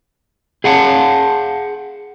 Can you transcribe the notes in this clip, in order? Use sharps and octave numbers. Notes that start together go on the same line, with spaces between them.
G#4 F5 F#5 A5